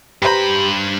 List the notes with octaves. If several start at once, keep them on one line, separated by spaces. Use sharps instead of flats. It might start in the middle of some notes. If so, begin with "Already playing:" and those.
G2 G4 B4 C5 A#5 B5